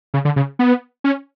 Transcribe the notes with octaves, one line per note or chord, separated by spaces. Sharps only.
C#3
D3
C#3
B3
C#4